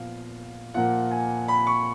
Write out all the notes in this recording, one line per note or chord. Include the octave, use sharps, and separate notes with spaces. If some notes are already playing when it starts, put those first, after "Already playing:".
Already playing: A#2 F3 B3 F5
A#2 F3 A#3 F#5
G#5
B5
C#6